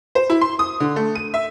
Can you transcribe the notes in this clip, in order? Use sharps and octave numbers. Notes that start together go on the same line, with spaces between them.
C5
E4
C6
D#6
D3
A3
D#7
E5